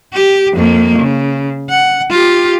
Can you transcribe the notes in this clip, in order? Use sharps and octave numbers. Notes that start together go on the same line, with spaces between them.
G4
F2 A#3
C#3
F#5
F4 G4